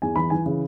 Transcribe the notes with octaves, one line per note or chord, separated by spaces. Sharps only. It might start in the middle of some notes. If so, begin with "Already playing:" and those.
E2 G#5
E3 B5
E3 G#5
C#3